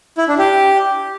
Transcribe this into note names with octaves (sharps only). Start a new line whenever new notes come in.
E4
D4
G4